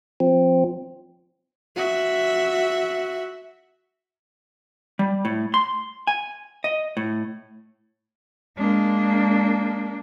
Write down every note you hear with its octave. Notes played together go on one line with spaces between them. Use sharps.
F3 C4
F#4 E5
G3
A2
C6
G#5
D#5
A2
G#3 A#3 D4